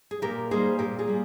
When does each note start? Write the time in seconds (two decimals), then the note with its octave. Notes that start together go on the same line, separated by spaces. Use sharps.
0.11 G#4
0.22 A#2 G4 A#4
0.51 G3 A#3 D#4 G#4 C5
0.79 A#2 G4 A#4
0.99 F4 G#4
1.08 G3 A#3